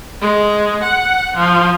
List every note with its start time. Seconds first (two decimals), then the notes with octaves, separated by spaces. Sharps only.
0.21 G#3
0.83 F#5
1.36 F3